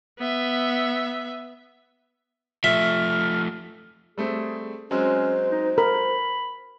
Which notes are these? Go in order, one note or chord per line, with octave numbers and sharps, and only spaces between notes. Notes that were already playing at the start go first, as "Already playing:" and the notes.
B3 E5
F3 A3 E5 F6
G3 A3 C4 G#4
F#3 G#3 C4 C#4 C5
D#4
A#4 B5